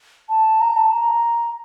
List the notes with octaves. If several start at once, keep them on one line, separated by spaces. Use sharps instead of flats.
A5
A#5
A5
A#5